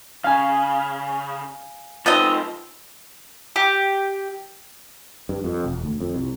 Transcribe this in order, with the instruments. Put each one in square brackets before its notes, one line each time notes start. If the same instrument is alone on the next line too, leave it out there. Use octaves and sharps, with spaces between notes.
[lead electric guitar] C#3 [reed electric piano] F5 G#5
[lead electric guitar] F3 D#4 [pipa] B3 C4 D#5
[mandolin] G4
[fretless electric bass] G2
F2
E1
D2
F2
C2